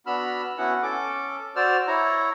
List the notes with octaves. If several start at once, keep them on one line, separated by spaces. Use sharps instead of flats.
B3 D4 F#4 B5 E6 F6
B3 C#4 E4 F#4 F#5
C#4 A4 D6
F#4 C5 D5 E6 F6
E4 C#5 A#5